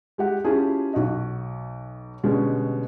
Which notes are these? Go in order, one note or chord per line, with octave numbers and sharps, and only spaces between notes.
G#3 G4 F#5
C#4 E4 F4 G4 G#4 A5
B1 F#4 D#5
B2 D3 G3 G#3 C#4